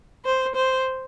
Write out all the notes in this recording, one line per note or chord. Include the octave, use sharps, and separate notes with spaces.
C5
C5